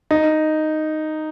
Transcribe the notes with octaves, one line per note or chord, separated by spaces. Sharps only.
D#4